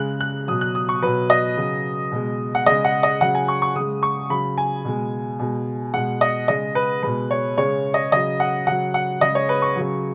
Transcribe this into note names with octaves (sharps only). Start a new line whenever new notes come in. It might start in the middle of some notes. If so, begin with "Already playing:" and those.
Already playing: C#3 G#3 F#6
F#6
B2 F#3 D#6
F#6
D#6
C#6
B2 F#3 B4
D#5
C#3 F#3
B2 G#3
F#5
C#3 G#3 D#5
F#5
D#5
C#3 F#3 F#5
G#5
C#6
C#6
C#3 G#3 D#6
C#6
C#3 F#3 B5
G#5
B2 G#3
B2 G#3
B2 G#3 F#5
D#5
C#3 G#3 D#5
B4
B2 G#3 B4
C#5
C#3 G#3 C#5
D#5
C#3 F#3 D#5
F#5
C#3 F#3 F#5
F#5
C#3 G#3 D#5
C#5
B4
C#6
C#3 F#3